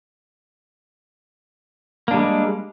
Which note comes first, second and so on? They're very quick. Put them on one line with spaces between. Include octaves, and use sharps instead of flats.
A#3 D4 G3 G#3